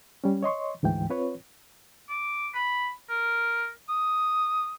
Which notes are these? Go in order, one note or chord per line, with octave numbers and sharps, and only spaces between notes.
G3 C#4
C#5 D#5 C6 C#6
D2 G#2 E3 G5
C4 F4 B4 C#5
D6
B5
A#4
D#6